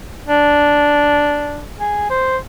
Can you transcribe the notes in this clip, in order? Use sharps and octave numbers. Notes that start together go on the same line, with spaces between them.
D4
G#4
C5